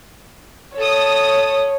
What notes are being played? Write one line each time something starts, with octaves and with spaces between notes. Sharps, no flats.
A4 C#5 D#6